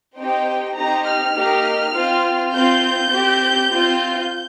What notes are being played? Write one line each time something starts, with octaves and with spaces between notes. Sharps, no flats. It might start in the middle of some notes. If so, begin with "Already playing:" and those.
C4 D#4 G4 G5
C4 D#4 G4 A#5
F6
A#3 D#4 G4
C4 F4
C4 F4 G6
C4 G4
C4 F4